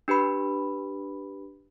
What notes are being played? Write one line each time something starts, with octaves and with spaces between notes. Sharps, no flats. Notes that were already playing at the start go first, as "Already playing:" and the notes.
D4 G4 B4 B5